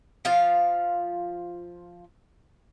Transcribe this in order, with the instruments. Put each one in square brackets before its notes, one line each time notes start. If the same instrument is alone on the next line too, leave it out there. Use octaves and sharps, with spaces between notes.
[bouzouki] F3 F4 F5